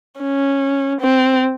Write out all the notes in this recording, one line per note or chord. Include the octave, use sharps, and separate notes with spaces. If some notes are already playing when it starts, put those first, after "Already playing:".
C#4
C4